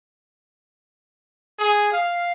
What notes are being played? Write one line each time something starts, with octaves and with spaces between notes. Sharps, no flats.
G#4
F5